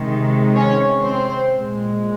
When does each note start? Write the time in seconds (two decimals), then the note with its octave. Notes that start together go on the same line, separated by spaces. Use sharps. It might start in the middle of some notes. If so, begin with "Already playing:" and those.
Already playing: C3 D#3 G#3
0.56 C#4 C#5
1.05 C4 C5
1.54 A#2 G#3